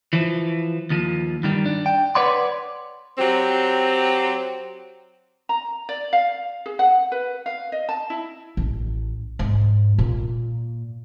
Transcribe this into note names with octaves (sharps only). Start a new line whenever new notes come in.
E3 F3
D#2 F3
G2 D#3 G3
D4
G5
B4 C#5 D5 F#5 C6
F#3 C4 G4
A#5
D5
F5
G#4
F#5
B4
F5
D#5
A5
E4
A1
G#2
A#2